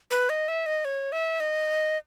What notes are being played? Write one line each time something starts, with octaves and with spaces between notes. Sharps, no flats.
B4
D#5
E5
D#5
C#5
E5
D#5